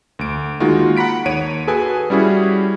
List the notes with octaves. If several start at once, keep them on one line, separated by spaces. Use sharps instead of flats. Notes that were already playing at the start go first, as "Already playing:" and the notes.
D2 D7
D#3 G#3 A#3 D#4 F4 F#4
F#5 A#5 B5 B6 D7
D#2 C#5 D7 D#7
F#4 G#4 A4 B4 G#5
G3 C#4 E4 F#4 G#4